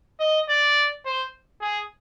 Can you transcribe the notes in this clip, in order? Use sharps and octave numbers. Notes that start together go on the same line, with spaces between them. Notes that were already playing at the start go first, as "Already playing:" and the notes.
D#5
D5
C5
G#4